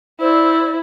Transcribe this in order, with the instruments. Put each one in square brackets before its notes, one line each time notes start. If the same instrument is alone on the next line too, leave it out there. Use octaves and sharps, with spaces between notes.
[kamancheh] E4 [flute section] C5 D5 E6